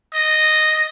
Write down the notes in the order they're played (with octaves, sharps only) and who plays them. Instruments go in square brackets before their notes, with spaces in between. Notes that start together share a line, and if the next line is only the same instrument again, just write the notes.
[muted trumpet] D#5